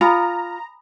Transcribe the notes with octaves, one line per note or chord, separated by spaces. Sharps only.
F4 G#5 A#5 B5 D#6